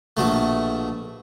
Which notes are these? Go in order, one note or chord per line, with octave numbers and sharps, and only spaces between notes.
A#1 B2 A3